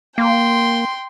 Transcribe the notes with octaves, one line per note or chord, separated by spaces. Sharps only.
A#3 G5 C6